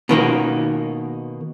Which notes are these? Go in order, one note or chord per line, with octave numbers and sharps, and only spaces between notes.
B2 D#3 A#3